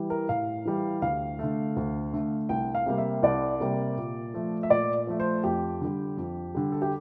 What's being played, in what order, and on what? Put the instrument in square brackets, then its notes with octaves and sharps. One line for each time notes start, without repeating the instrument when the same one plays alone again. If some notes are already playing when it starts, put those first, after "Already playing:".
Already playing: [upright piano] E3 G3
A#4
A2 F5
E3 G3
D2 F5
D3 A3
D2
D3 A3
C2 G5
F5
C3 G3 A#3
E5
C2 D5
C3 G3 A#3
A#2
F3 A3
E5
A#2 D5
F3 A3
C5
F2 G4
D3 G3
F2
D3 G3
A4
G4